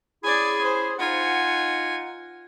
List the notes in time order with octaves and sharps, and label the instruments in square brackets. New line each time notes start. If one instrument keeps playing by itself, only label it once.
[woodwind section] C#4 E4 G#4 [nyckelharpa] D5 G#5
[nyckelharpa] C5
[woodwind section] D#4 F#5 [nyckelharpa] F4 G#5